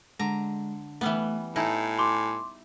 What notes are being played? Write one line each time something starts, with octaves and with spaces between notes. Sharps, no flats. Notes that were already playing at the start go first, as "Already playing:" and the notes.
D3 G#3 A#5
E3 G3 A3 B3
A2 D#4 E4 G#5
C6 D6